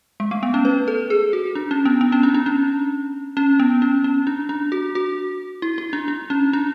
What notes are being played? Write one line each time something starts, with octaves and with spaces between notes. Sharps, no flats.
G#3
A3
B3
C#4
B4
A4
G#4
F#4
D4
C#4
B3
B3
C#4
D4
D4
C#4
C#4
B3
C#4
C#4
D4
D4
F#4
F#4
E4
E4
D4
D4
C#4
D4